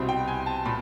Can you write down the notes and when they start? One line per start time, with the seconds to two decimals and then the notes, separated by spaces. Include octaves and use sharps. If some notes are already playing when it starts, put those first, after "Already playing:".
Already playing: C2 B2 G3 C4
0.09 G5
0.28 G#5
0.46 A5
0.65 A#2 B5